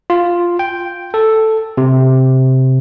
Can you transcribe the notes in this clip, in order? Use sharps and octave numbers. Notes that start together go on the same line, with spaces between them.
F4
G5
A4
C3